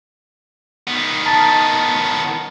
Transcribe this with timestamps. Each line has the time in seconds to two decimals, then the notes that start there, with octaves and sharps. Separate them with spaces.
0.88 D#3 B3
1.26 A5 A#5 A6